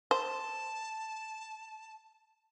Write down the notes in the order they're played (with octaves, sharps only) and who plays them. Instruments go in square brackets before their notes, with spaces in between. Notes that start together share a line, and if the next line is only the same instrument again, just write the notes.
[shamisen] C5 [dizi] A5